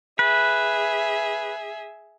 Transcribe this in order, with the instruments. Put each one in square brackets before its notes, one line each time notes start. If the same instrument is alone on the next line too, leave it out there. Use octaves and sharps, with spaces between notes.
[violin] G#4 E5 [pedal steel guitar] B4